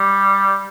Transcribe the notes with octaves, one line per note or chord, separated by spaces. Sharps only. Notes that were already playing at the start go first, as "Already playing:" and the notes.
Already playing: G3